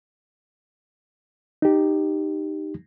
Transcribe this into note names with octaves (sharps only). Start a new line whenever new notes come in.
D#4 G4